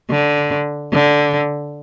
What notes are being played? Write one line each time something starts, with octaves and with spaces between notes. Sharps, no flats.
D3
D3